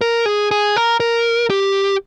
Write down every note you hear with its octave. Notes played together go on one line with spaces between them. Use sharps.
A#4
G#4
G#4
A#4
A#4
G4